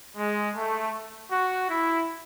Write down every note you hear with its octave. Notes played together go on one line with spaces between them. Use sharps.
G#3
A3
F#4
E4